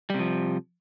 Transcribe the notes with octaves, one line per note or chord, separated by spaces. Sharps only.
C3 F3 G3